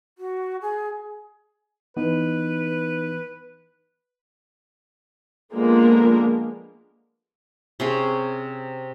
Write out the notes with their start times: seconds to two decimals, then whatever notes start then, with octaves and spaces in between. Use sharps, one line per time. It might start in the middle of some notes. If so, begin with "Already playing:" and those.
0.18 F#4
0.62 G#4
1.97 E3 B3 D#4 B4
5.53 D3 F3 G#3 A#3 B3 A#4
7.80 C3 C#4 G#4